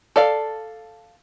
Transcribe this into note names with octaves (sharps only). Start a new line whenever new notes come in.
A4 D5 F5